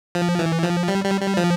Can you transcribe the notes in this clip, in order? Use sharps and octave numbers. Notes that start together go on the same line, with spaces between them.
F3
E3
F3
G3
G3
G3
F3